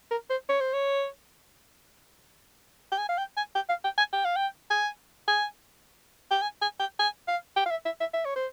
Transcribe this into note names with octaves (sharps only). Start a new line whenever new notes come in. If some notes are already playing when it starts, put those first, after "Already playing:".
A#4
C5
C#5
C5
C#5
G5
G#5
F5
G5
G#5
G5
F5
G5
G#5
G5
F5
G5
G#5
G#5
G5
G#5
G#5
G5
G#5
F5
G5
F5
E5
E5
E5
E5
C#5
C5